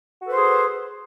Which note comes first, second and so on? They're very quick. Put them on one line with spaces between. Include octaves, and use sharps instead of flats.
F#4 A4 B4 C5 G#4